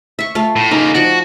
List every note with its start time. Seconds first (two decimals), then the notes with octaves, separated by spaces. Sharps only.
0.19 E5 C#6
0.35 A3 F4 F5
0.56 A2
0.71 C#3 A#3 D#4
0.95 F3 F#4 D5 F#5